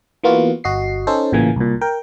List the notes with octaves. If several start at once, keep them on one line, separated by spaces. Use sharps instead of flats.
E3 A#3 B3 F4 F#4
G1 F#4 D#5 C7
C#4 D#4 A4 C5
A1 A#2 C#3 E3 A#3 G#5
C2 A#2
A#4 G5